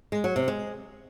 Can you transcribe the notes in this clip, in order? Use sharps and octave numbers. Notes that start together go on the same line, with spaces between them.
G#3
F#3
C3
G#3